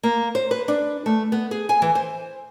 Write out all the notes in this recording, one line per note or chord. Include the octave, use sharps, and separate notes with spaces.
A#3
C5
B4
D4
A3
B3
G#4
G#5
E3
C5